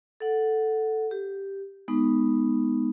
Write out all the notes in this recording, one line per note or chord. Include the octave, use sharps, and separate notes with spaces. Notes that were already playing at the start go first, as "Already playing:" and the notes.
A4 F#5
G4
G#3 B3 D#4